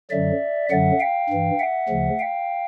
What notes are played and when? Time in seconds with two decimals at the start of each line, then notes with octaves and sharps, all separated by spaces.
0.10 F#2 D3 F#3 D5 E5
0.70 F#2 D3 F#3 E5 F#5
1.00 F5 G5
1.29 G2 E3
1.59 E5 F#5
1.89 D2 C#3 F3
2.19 F5 G5